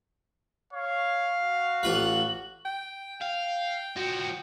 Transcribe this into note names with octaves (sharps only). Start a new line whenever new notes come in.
C#5 F5
F#4
A1 F4 B4 F#7
G5
F5 G5
F3 F#4